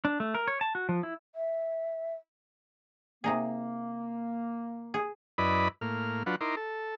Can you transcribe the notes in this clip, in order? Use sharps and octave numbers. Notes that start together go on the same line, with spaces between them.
D4
A3
A#4
C#5
A5
F#4
F3
E4
E5
C3 A#3 D#4 G#4
G#4
F#2 E4 B4 D5 D#5 B5
A2 A#3 F6
F#3 D4 F4 B4 F#5
D#4 E4 A#4 C6 D6
A4